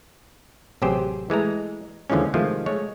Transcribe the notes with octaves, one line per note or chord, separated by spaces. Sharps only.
A1 C3 F#3 G4 G#4 C5
E3 G#3 A3 A#5
D#2 D3 E3 F3 G#3 C#4
C3 D#3 F3 G#3 A3
G#3 A3 C#5